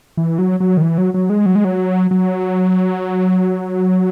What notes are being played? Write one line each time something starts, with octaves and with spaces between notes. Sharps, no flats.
E3
F#3
F#3
D#3
E3
F#3
F#3
G#3
F#3
G#3
F#3
F#3